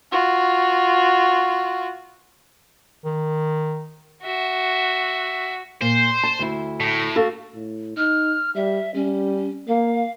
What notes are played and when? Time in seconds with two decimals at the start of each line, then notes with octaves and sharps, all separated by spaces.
0.12 F4 F#4
3.05 D#3
4.23 F#4 E5
5.81 A#2 C5
6.23 A5
6.39 D2 E4
6.80 A2
7.16 F#4 A4 F5
7.54 A2
7.97 D#4 F6
8.55 G3 E5
8.95 G3 C#4
9.68 A#3 F5